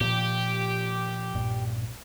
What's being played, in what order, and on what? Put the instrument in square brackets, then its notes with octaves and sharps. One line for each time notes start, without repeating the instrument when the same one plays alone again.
[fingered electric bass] A#2 F3 [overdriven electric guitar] G4
[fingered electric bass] B1 G2 A#2